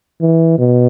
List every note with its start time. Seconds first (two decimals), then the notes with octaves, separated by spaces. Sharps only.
0.21 E3
0.58 B2